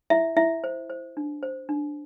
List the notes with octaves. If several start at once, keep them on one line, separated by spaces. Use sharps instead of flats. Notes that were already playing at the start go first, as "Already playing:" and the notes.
E4 E5
E4 E5
C5
C5
D4
C5
D4